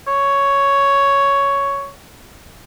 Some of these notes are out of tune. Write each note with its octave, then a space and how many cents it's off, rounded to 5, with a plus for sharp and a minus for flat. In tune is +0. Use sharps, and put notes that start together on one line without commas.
C#5 +5